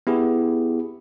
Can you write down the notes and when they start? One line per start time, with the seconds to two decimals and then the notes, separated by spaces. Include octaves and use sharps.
0.07 B3 E4 G4 G#4